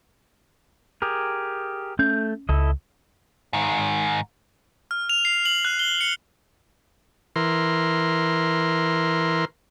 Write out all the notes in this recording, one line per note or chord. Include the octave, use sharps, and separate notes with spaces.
G4 G#4 A#4
A3 C#4 G6
C#2 E4 A4 D#5
G#2 D#3
F6
F7
C7
F#7
F#6
G7
C#7
E3 A#4 C6